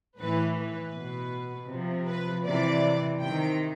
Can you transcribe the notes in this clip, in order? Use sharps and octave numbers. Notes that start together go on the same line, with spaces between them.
A2 E3 B4
B4
B2
C3 F3
B4
C3 E3 D5
C3 D#3 G5